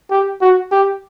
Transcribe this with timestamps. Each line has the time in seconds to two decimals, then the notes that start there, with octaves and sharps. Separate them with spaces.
0.11 G4
0.41 F#4
0.72 G4